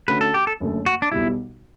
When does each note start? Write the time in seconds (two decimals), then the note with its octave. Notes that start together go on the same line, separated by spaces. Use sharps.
0.08 D3 A3 C#4 F#4 B4
0.21 A4
0.34 G4
0.47 A4
0.60 F#1 F#2 D3 A3
0.86 F#4
1.02 D4
1.12 B1 B2 G3 E4